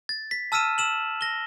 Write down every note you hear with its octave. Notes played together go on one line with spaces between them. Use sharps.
A6
B6
A5 E6 F6 B6 D#7 E7
E6 E7 F#7
A#6 G7